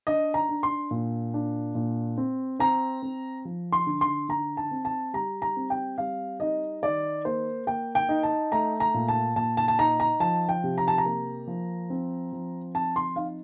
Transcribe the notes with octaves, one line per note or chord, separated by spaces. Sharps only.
D4 D#5
A#5
D4
C6
A#2
D4
A#2
C4
C4 A#5
C4
F3
C6
D3
C6
D3 A#5
A5
C4
A5
G3 A#5
A#5
C4
G5
G3 F5
D#4 D#5
D#3 D5
A#3 C5
A#3 G5
G5
D#4
A5
A3 A#5
A#5
A#2
A5
A#2 A5
A5
A5
D#4 A#5
A#5
F3 A5
G5
C3
A#5
A5
A#5
A#3
F3
C4
F3
C4 A5
C6
D#4 F5